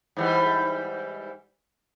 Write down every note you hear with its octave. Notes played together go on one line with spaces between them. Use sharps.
G#2 E3 G3